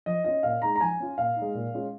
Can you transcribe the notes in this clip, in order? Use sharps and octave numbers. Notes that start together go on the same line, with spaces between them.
F3 D#5
C#4 F4 D#5
A#2 F5
G#3 D#4 A#5
A#5
F3 G#5
C#4 F4
A#2 F5
D#4
G#3
A#2
G#3 C#4 F4